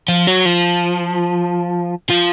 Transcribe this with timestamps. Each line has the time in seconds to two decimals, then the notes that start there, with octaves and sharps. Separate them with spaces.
0.08 F3
0.27 F#3
0.45 F3
2.10 F3